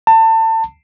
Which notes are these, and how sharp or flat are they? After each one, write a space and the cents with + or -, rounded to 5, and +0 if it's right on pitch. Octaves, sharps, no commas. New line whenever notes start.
A5 +30